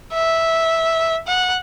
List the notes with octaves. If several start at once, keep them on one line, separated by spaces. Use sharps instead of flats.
E5
F#5